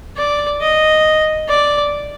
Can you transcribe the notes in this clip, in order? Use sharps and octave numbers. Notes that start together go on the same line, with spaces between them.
D5
D#5
D5